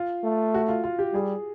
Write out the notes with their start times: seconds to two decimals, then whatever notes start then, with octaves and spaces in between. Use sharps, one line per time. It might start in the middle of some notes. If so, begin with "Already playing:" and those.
Already playing: F4
0.24 A3
0.54 F#4
0.68 F4
0.84 F4
0.99 G4
1.14 G3 G#4